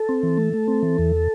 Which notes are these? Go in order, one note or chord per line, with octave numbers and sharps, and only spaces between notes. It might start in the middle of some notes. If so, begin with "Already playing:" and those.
Already playing: A4
C4
E3
A3
A3
C4
E3
E2